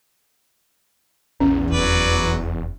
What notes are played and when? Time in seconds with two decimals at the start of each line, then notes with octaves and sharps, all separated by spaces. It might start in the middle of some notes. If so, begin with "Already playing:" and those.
1.40 A#1 E2 C#4
1.71 F1 F#3 B4 D5